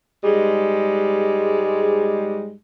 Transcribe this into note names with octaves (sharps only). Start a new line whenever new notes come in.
G#2 G3 G#3